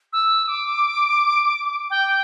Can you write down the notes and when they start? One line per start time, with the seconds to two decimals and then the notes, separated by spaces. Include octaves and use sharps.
0.13 E6
0.48 D6
1.90 G5